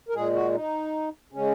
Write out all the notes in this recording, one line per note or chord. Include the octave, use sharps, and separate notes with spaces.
A#4
A#2 G#3 G#4
F#4
D#4
C#3 G#3 C#4